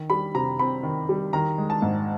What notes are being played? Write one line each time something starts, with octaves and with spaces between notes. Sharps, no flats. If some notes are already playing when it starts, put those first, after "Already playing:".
Already playing: D#3
G3 B5
C3 A#5
C4 B5
D#3
G3
D#3 A#5
G#3
A5
G#2